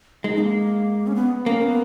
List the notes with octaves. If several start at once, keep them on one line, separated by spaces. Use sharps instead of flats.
G#3 D#4
A#3
C#4
B3
A#3 C#4
B3